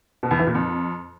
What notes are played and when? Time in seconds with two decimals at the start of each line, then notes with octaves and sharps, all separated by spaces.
0.23 B2
0.31 E2
0.39 E3
0.47 A#2
0.55 F2